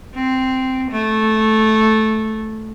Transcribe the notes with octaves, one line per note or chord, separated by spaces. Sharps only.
C4
A3